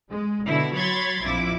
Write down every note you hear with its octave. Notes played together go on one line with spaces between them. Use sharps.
G#3
B2 D3 E4
F#3 C#5 B5 C6 G#6 A6
A#1 F2 E4 D6